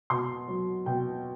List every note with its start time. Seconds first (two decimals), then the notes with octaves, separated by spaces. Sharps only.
0.10 B2 C6
0.48 F#3
0.86 B2 G5